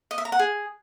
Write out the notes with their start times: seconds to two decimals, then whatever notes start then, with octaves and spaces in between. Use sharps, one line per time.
0.11 D#5
0.18 E5
0.25 A#5
0.32 F#5
0.39 G#4